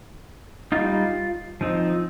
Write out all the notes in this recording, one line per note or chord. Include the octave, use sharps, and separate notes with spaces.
G3 D#4 F4
F3 C4 D#4